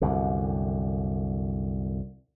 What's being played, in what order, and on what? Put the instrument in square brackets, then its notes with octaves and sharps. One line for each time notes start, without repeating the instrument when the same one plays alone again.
[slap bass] C2 F#2 D3